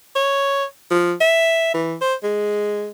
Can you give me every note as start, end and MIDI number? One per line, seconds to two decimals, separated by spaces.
0.16 0.65 73
0.91 1.13 53
1.21 1.71 76
1.74 1.95 52
2.01 2.14 72
2.23 2.89 56